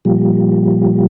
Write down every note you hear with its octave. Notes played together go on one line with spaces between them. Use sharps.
A#2 F3 G3